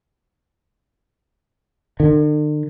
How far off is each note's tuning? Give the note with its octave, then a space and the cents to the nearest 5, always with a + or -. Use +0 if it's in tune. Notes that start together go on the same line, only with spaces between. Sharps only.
D3 +45